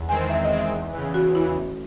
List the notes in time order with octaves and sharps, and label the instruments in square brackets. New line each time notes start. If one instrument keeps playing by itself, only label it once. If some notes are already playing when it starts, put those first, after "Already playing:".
Already playing: [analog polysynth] E2
[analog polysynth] D#3 G#3 C4 [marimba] G#5
[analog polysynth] E2 [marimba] E5
[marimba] D#5
[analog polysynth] D#3 G#3 C4
[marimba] E5
[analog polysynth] E2
C#3 E3
[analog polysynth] E2 [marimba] F#4
[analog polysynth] C#3 E3 [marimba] E4
[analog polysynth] A1